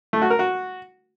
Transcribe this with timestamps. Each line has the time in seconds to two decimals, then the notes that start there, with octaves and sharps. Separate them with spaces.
0.13 A3
0.22 F#4
0.30 A#4
0.39 F#4